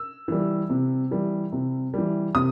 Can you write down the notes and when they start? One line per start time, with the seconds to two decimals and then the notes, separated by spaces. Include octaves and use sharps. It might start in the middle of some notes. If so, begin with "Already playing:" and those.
Already playing: E6
0.28 E3 G3
0.70 C3
1.11 E3 G3
1.52 C3
1.94 E3 G3
2.35 C3 D#6